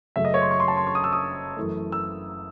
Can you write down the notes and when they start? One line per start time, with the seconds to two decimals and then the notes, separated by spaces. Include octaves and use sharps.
0.16 F#1 F#2 C#3 F#3 A3 E5
0.25 D#5
0.34 C#5
0.42 C6
0.51 C#6
0.60 C6
0.68 A5
0.77 C6
0.87 C#6
0.95 D#6
1.04 E6
1.13 D#6
1.57 F#2 E3 A3
1.92 E6